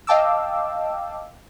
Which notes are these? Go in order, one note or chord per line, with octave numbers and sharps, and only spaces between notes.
D#5 F5 G5 A5 D6 E6